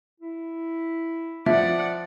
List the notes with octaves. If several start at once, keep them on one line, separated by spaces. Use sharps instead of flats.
E4
F3 D5 E5 F#5